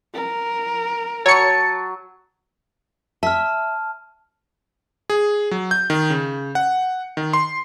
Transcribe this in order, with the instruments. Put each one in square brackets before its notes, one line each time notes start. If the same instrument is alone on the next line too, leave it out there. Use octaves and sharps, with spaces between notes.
[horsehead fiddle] A#4
[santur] F#3 [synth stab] C#5 C#7 [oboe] A5
[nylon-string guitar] E5 [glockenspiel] A5 F6
[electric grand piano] G#4
F#3
G6
D#3
C#3
F#5
D#3
C6